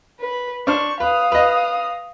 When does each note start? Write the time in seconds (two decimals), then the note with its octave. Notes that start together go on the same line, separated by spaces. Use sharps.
0.20 B4
0.67 D4 C5 C#6 F6
1.00 B4 F5 D#6
1.32 B4 D#5